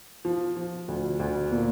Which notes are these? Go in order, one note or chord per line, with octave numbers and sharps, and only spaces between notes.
F3
F3
D2
D2
A#2